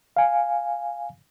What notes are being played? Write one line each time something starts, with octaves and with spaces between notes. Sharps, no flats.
F5 G#5